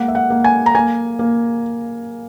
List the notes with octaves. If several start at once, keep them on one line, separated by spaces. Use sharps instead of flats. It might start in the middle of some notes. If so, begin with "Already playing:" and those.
Already playing: G#3 A#3 F#5
E5
F#5
A#3
G#5
A#5
A#3 G#5
A#3